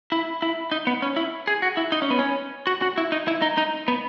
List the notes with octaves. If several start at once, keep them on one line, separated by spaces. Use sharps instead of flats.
E4
E4
D#4
B3
C#4
E4
G#4
F#4
E4
D#4
C#4
B3
C#4
F#4
F#4
E4
D#4
E4
D#4
D#4
B3